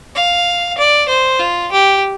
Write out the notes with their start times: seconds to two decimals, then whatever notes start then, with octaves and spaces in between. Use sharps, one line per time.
0.16 F5
0.78 D5
1.08 C5
1.39 F4
1.72 G4